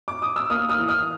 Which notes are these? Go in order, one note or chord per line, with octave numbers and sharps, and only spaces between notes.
D6
D#6
E6
A#3 D#6 F6
D#6 F6
E3
D#6 F6